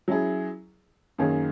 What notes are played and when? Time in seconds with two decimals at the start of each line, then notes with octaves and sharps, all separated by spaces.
0.08 F#3 C#4 E4 G#4
1.18 F#2 D#3 A#3 C#4 G#4